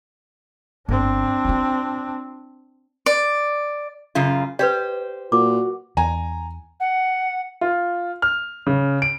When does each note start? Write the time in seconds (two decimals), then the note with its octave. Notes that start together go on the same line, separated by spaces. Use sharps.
0.89 G1 C4 D4
1.45 D#4 F4
3.06 D5
4.15 F#2 C#3 F4
4.59 G4 B4 C5 D5
5.32 A#2 F#4 D6
5.97 E2 G#5 A#5
6.80 F#5
7.61 F4
8.22 F6
8.67 C#3
9.02 D7